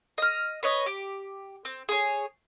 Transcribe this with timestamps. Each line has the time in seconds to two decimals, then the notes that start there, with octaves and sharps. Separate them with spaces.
0.18 D#5 F6
0.63 B4 C#5 D#5
0.86 G4
1.65 C4
1.89 G#4 C#5